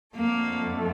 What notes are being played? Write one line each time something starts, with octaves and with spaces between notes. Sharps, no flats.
F2 D3 A3 A#3